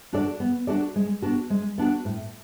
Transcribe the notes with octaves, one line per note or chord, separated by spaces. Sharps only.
D4 F#4 A4 D5
B3
D4 F#4 A4 D5
G#3
B3 D4 F#4
G#3
B3 D4 F#4
A2